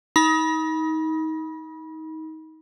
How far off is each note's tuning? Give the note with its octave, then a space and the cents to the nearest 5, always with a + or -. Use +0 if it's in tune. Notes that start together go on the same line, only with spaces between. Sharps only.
D#4 +25 B5 -25